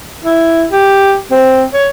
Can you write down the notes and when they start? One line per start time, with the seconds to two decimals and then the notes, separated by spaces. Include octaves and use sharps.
0.24 E4
0.71 G4
1.31 C4
1.74 C#5